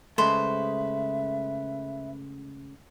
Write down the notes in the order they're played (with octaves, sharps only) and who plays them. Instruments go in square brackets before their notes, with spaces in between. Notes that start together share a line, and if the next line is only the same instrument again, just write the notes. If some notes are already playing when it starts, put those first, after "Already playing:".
[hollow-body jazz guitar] C#3 G#3 A3 [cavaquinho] B4 C5 [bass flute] E5